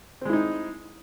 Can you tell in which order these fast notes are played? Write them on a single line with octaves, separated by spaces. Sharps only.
C4 G#3 E4 D#4